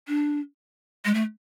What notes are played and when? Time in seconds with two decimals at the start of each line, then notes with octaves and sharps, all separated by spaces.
0.08 D4
1.05 G#3
1.14 A3